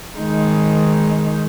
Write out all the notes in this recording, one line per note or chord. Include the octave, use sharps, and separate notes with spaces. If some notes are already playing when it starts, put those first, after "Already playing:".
D#3 G#3 D#4